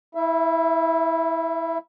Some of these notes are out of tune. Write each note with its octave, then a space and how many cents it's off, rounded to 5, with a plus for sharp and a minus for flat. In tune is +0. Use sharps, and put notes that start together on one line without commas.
E4 -15 E5 +25